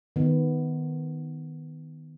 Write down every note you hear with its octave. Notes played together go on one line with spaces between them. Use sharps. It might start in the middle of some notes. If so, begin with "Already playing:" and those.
D#3 B3